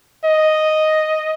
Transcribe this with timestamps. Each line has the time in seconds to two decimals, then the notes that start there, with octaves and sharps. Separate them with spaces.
0.25 D#5